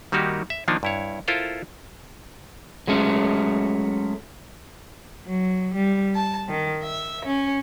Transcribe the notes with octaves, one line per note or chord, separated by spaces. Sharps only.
D#3 G3 A#3 D#4 F#4 G4
E5
D#3 F3 A#3 D4 D#4
G2 E4 C#5
E4 F4 A4 A#4 C5 F5
F#3 G#3 A3 C#4
F#3
G3
A5
D#3
E5
C#4